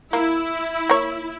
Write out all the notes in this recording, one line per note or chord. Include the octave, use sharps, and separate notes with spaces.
A#3 E4
A#3 C#5